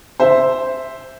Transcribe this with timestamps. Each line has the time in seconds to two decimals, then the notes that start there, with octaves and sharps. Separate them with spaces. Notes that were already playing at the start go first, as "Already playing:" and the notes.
0.20 C5 E5